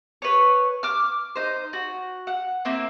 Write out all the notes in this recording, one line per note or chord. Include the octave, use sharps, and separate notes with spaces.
B4 C#5
D6 F6
D#4 C5
F#4
F#5
A#3 C4 E4